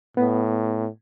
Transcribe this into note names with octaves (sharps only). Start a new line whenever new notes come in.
A2 B3